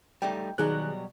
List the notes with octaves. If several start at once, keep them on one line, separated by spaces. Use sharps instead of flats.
G3 A3 D#4 G5
B2 D#3 F#3 G3 G#4 F#6